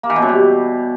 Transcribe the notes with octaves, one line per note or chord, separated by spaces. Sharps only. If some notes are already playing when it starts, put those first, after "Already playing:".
A#3
E3
B2
F#2
G3